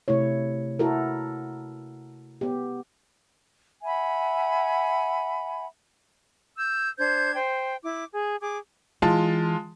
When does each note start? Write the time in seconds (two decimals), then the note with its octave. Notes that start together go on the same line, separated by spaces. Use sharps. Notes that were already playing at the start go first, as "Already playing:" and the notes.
0.08 C3 A3 E4 C#5
0.79 E4 F#4 A4 A#4
2.41 B3 G4
3.83 E5 F#5 G#5 B5
6.57 E6 G6
6.99 D4 C5 G6 G#6
7.35 C5 G5
7.83 E4 D6
8.11 G#4
8.41 G#4 D6
9.02 E3 G#3 F4 A5